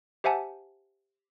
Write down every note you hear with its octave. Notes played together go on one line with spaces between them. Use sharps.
G4 C5 E5 F#5 G#5 A5